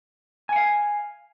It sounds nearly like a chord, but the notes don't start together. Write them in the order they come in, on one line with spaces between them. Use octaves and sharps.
G#5 F#5 F5